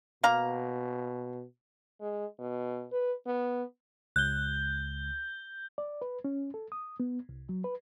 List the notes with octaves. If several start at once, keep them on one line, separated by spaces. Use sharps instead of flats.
B2 A#3 F5 A#5
G#3
B2
B4
B3
C#2 F#6 G6 G7
D5
B4
C#4
A4
D#6
B3
C2
F#3
B4